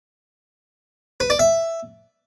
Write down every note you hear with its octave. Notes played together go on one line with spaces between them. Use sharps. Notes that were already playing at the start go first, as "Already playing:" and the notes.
B4
D5
E5